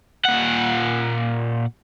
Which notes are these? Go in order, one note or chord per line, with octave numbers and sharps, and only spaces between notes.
A#2 F#5